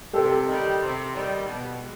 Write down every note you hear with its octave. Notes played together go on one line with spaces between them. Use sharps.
C3 G4 A4
D#3 G3
C3
D#3 G3
B2
G#3